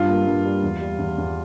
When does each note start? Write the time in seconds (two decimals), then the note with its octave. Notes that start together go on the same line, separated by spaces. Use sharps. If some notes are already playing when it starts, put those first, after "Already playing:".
Already playing: G2 F4
0.08 A#3
0.27 G2
0.45 G3
0.63 E2
0.81 G3
0.99 E2
1.18 E2